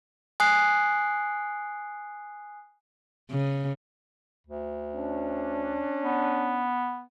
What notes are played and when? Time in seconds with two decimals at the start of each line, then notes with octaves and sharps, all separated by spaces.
0.40 G#5 D#6 F#6 C7
3.31 C#3
4.47 D2
4.94 C#4 D4
6.04 B3